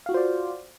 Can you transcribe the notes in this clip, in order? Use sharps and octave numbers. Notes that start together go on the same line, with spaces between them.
F4 F#4 C5 D5 F5